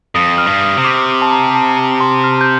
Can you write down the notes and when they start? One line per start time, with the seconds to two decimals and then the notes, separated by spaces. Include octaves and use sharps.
0.15 F2 D#6
0.38 F6
0.46 G2
0.62 D#6
0.77 C3
0.85 D6
1.22 A5
1.31 A#5
1.55 A5
2.01 C6
2.24 F6
2.41 G6